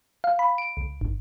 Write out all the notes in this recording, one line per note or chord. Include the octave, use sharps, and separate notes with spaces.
F5
B5
D7
C#2
G1